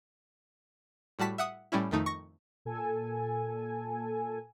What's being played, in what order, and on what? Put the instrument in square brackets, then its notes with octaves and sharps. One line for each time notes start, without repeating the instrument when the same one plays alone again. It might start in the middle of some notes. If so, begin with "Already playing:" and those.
[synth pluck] A2 G3 F#4 A5 B6
E5 F#5 D#6
A2 G3 C#4 E4
F2 D#3 A3 D#4
C#6 A#6
[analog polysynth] A#2 A4 G#5